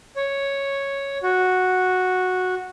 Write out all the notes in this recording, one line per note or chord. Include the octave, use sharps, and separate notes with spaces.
C#5
F#4